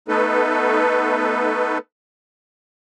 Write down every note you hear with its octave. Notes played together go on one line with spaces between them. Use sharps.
A3 B3 D#4 A4 B4